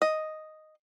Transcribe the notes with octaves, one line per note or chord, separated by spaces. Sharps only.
D#5